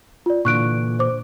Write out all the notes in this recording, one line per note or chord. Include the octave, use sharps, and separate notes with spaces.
F4 D5
A#2 D3 E3 C#6 F#6 D7
C5 D6